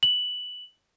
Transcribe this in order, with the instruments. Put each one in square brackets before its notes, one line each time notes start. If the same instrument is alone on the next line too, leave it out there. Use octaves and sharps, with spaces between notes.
[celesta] F#7